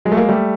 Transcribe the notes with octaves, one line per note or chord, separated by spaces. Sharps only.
F#3 G#3
A3
G#3 A#3
G3 A3